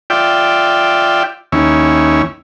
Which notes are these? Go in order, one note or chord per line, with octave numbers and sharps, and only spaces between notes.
F4 D5 E5 G5
D#2 C#4 E4